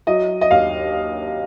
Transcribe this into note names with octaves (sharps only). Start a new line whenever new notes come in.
F#3 D#5
D#5
D#2 F5